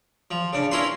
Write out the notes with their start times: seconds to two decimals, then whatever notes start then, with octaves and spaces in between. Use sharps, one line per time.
0.31 F3
0.53 C#3 D4
0.71 C#4 E4 F4 A#4 B4 C6